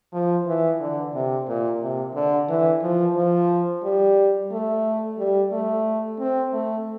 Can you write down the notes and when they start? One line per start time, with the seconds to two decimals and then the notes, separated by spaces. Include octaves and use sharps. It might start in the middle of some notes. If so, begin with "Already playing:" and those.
0.13 F3
0.46 E3
0.80 D3
1.14 C3
1.47 A#2
1.81 C3
2.15 D3
2.48 E3
2.82 F3
3.16 F3
3.83 G3
4.51 A3
5.18 G3
5.52 A3
6.19 C4
6.53 A3